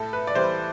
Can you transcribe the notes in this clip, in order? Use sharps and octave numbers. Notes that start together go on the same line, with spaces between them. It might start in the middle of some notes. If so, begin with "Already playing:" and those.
Already playing: A2 A4
B4
D5
E3 G3 C5